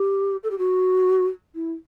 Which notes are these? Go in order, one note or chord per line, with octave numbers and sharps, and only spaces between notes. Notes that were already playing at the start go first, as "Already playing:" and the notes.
Already playing: G4
A4
G4
F#4
E4